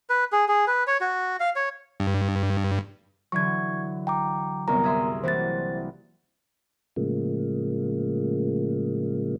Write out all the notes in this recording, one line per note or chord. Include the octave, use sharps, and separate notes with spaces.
B4
G#4
G#4
B4
C#5
F#4
F5
C#5
G2
D3 E3 F#3 C#6 G#6
G5 A#5 D6
C2 F#2 B3 A#4 A#5
G#4 E5 C6
E3 A#3 F#4 C5 A6
A2 C#3 F3 G#3 A#3